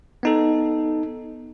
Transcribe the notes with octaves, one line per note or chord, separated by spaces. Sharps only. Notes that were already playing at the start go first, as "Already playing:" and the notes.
B3 D#4 A4